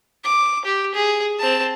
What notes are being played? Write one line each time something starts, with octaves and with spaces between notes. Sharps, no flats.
D6
G4
G#4
C4 A5